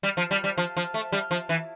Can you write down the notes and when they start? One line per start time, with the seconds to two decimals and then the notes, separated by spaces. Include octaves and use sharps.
0.03 G3
0.17 F3
0.31 G3
0.44 G3
0.58 F3
0.77 F3
0.94 A3
1.12 G3
1.31 F3
1.49 E3